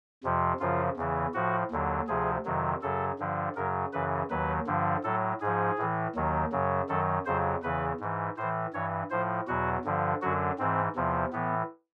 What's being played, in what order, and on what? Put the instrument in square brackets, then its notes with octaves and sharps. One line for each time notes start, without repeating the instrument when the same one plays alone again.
[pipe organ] F2 C3 F3
F#2 C#3 F3 F4
E2 C#3 E3
A2 F3 F#4
D#2 D3 F#3
D2 C3 F3 G#4
F2 C3 D#3 F#3
F#2 C#3 F#3 A4
G2 D3 F3
F#2 C#3 F#3 A#4
F#2 C#3 E3 B4
D#2 D#3 F#3 B4
G2 D3 F3
A2 F#3 A4
G#2 F3 G#4
A2 E3
D#2 D#3 F#3
F#2 C#3 F#3
F#2 D#3 F#3 A4
F2 C#3 F#3 C5
E2 C#3 E3 B4
G#2 E3
A2 E3 C5
G2 E3 C#5
A2 F3 C5
E2 B2 F#3 F#4
G2 D3 F3
F#2 D3 F#3 F#4
G#2 E3 C4
E2 C3 F3
A2 E3 B3